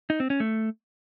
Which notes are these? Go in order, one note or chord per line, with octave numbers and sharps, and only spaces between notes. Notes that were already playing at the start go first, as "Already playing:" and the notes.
D#4
C4
C#4
A3